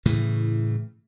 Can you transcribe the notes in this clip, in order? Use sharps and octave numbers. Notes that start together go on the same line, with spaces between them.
A2 C#3 E3